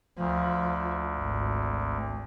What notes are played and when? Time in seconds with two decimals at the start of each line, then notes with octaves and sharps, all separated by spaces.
0.18 D2 F3
1.18 G#1